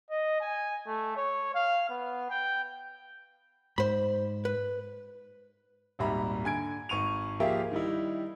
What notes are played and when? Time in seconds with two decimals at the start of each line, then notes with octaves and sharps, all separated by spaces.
0.10 D#5
0.41 G#5
0.87 A3
1.17 C#5
1.55 F5
1.90 B3
2.30 G5
3.78 G#2 C5 B5
4.45 B4
5.99 D#1 G#1 G3 E5 A#5 B5
6.44 D3 G#5 G#6 D7
6.89 G#1 C#6 D#7 F7
7.40 F3 A#3 F4 G4 G#4 E5
7.71 D#3 G3 D#4 E4